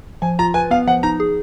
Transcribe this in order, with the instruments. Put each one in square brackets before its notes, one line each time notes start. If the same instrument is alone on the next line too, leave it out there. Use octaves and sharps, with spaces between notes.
[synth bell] F3 [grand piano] G#5
[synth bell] F4 [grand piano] A#5
[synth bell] B4 [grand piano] G#5
[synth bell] B3 [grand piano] F5
[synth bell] F3 [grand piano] F#5
[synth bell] D#4 [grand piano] A#5
[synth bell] G#4